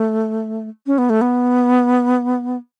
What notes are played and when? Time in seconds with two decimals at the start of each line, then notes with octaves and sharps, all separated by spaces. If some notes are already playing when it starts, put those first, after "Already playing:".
Already playing: A3
0.87 C#4
0.98 B3
1.10 A3
1.21 B3